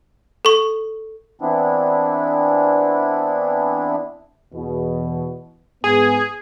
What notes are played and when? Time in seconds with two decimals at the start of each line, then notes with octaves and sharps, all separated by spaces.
0.45 A4 C#6
1.41 E3 B3 C4 D4 E4
4.54 E2 B2
5.84 G#2 B3 G#4